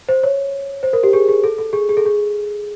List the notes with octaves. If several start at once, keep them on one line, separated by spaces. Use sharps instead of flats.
C5
C#5
C5
A#4
G4
G#4
G#4
A4
A4
G#4
G#4
A4
G#4